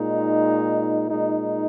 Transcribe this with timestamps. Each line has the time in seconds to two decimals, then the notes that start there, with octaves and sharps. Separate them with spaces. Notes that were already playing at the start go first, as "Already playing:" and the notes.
Already playing: A#2 G#3 D#4
1.10 A#2 G#3 D#4